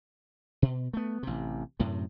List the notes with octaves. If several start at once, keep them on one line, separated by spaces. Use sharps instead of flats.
B2
A3 B3
A1 C3
F#2 A2 C3